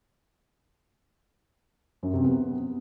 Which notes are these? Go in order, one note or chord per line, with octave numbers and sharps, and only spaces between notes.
F#2
C3
B3